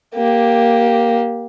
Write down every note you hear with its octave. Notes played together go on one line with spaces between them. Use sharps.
A#3 G4